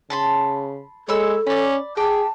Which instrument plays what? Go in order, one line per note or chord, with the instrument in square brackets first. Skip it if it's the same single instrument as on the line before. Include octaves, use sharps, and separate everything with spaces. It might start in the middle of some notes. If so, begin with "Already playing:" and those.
[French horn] C#3 [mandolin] A5 B5 C6
[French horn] G#3 [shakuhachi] A4 [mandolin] C#5 B5 E6
[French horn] C#4 [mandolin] D5 B5
[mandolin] G4 [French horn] G#4 [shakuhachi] A5